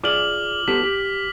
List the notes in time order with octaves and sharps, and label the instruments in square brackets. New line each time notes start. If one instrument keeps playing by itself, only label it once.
[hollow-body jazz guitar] F4 G#4 D5 [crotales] D6 F6 F#7
[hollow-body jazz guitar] B3 G4 A4 [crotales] B6
[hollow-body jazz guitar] G4